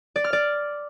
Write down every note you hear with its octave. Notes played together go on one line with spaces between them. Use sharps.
D5
F6
D5